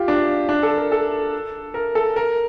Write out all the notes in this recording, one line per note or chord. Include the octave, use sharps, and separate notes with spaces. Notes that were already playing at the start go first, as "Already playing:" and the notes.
Already playing: F4 G4
D4
D4
A4
A#4
A4
A#4
A4
A#4